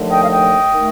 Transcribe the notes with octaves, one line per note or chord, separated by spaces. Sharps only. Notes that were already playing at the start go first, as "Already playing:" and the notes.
Already playing: D#2 D3 F3 A3
D#5 G5
F5
D#5 G5
D#3 A3